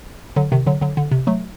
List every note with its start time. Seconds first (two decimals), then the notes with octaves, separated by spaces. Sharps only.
0.36 D3 F#3
0.52 C3 D#3
0.67 D3 F#3
0.81 D3 F#3
0.97 D3
1.11 C3
1.27 F#3 A3